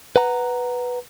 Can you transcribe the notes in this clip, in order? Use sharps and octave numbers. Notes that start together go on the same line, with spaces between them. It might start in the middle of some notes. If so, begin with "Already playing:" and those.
B4 F#5 A#5